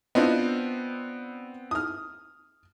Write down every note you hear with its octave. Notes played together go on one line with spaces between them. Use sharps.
B3 C4 D4 F4 D#5
D#6 F6